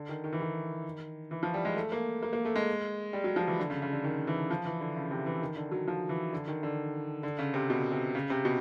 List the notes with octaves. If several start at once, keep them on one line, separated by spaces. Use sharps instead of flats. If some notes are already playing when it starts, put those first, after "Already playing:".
Already playing: D3
D#3
D#3
E3
D#3
E3
F3
G3
G#3
A3
A#3
A#3
A#3
A3
G#3
G3
F#3
F3
E3
D3
C#3
C#3
D3
D#3
E3
F3
E3
D3
C#3
C3
E3
D#3
D3
F#3
F3
E3
D3
D#3
D3
D3
C#3
C3
B2
C3
C#3
C3
B2